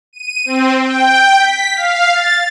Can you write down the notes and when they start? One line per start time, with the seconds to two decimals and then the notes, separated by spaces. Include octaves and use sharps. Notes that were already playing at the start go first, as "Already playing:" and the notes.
0.13 D#7
0.45 C4
0.81 G5
1.38 B6
1.75 F5
2.13 A6